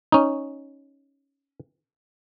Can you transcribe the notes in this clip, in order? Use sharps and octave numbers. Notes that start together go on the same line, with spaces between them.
C#4 D#4